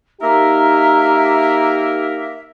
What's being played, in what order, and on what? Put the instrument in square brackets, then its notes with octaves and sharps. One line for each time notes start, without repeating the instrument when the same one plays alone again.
[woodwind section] A#3 A#4 E5 [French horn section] D#4 G4 [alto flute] A#5